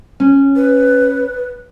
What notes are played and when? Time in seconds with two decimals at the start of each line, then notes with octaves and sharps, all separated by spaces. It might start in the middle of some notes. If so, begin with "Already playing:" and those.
0.20 C#4
0.56 B4